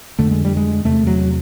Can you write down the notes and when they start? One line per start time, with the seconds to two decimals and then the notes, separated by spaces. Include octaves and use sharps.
0.19 F2 D3 A3
0.31 G#3
0.45 G3
0.57 G#3
0.85 E2 C3 A3
1.07 F#3